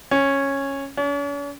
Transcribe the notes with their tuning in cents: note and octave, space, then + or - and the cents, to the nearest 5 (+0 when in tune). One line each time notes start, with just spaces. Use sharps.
C#4 -10
C#4 +45